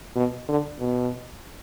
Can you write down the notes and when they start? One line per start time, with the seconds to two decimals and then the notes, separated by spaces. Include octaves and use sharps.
0.16 B2
0.48 D3
0.80 B2